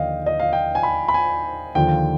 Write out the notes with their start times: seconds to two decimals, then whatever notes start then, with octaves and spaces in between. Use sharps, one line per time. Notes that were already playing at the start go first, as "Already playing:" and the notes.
Already playing: D#2 D3 F3 D#5 F5 G5
0.26 D#5
0.40 F5
0.53 G5
0.75 G#5
0.83 B5
1.09 B5
1.14 G#5
1.75 D#2 D3 F3 G5